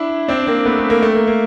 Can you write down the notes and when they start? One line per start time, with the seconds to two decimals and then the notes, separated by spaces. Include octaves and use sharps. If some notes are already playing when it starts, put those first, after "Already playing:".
Already playing: D4 E4
0.28 C4 D4
0.47 A#3 C4
0.66 A3 B3
0.78 A3
0.90 A#3
1.03 A3
1.15 A#3
1.27 A#3